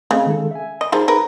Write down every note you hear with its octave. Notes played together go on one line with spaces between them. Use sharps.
C#3 A3 C4 D#5
D#3 G#3 A4
E5 G#5
D#5
F3 G3 D#4 G#4 A#4 C5
A#4 B4